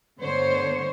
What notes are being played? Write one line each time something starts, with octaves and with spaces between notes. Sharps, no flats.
G2 D3 B3 C5 C#5